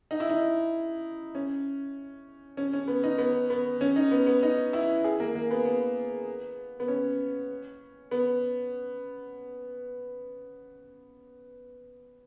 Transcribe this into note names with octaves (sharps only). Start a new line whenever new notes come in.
D#4
E4
D#4
C#4
C#4
C#4
B3
D#4
B3
B3
C#4
D#4
B3
B3
D#4
E4
G#4
A#3
A#3
B3
B3
B3
C#4
B3